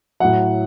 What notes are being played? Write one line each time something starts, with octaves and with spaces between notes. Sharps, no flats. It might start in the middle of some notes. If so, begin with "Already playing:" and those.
A2 F#3 F#5